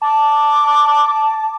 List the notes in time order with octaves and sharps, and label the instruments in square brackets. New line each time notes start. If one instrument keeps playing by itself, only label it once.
[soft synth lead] A5 [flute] D6